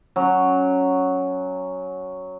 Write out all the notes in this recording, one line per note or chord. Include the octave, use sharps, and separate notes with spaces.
F#3 C#4